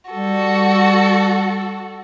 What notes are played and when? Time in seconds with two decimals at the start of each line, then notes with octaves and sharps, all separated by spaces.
0.12 G3 F#4 A4